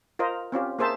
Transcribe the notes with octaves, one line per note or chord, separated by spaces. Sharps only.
F4 A#4 C5 D#5
C4 C#4 F4 G4
A#3 G#4 C5 E5 A5